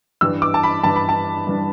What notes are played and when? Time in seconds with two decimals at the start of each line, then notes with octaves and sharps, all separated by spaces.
0.21 G2 E3 G3 D4 E6
0.42 D6
0.54 A5
0.63 B5
0.84 G2 E3 G3 D4 A5
0.96 B5
1.09 A5
1.47 G2 E3 G3 D4